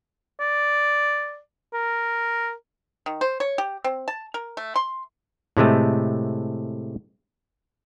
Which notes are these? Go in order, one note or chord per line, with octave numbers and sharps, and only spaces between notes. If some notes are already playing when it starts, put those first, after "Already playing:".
D5
A#4
D#3
C5
C#5
G4
C4
A5
A#4
A3
C6
A2 C3 G#3 A3